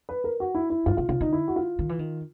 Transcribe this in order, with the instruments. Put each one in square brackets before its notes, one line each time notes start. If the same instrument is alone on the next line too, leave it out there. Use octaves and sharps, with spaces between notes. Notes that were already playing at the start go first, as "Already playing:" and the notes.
[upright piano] B4
A#4
F#4
E4
E4
[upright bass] G2 [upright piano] F4
[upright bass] C3 [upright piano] F4
[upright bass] C#3 [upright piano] F4
[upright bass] D3 [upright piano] D#4
[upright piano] E4
F#4
F4
[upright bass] D#3
E3
D#3